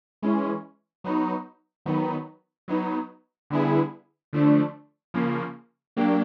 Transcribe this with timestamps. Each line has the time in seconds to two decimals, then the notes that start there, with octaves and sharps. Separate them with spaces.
0.22 E3 G#3 C#4
1.04 F#3 B3 D#4
1.86 D#3 F#3 B3 D#4
2.68 F#3 B3 D#4
3.50 D3 G3 B3 E4 G#4
4.33 D3 F3 A3 D4
5.14 C#3 F3 A#3
5.97 F#3 A#3 D4 G4